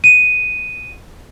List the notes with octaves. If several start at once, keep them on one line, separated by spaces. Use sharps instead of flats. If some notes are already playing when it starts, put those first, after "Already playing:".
D#7